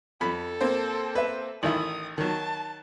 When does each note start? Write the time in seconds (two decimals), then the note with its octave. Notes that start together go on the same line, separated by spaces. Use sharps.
0.21 F2 A4 B5
0.61 A#3 C4 C5
1.15 B4 E5
1.63 A1 D#3 E4 D#6 F#7
2.18 D#3 F#3 A5